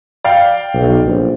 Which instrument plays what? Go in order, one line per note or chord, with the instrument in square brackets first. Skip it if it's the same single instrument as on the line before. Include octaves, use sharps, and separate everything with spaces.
[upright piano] D5 F5 G5
[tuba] B1
A#1